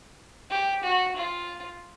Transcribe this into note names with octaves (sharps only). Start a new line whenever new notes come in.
G4
F#4
F4